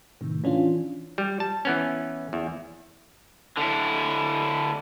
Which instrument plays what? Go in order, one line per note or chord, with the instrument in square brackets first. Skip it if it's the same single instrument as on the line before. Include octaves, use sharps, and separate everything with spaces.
[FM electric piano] A2 C3 D#3
E3 C#4 D4 F4
[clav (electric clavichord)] G3
A5
E3 B3 C#4
E2
[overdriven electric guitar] D3 E4